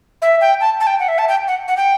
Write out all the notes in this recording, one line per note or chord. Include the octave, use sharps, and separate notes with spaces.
E5
G5
A5
A5
G5
F#5
E5
A5
G5
F#5
F#5
G5